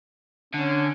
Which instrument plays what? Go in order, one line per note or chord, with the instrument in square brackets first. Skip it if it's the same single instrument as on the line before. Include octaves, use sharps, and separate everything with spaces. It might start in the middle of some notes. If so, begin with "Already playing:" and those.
[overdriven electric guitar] D3 [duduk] C#4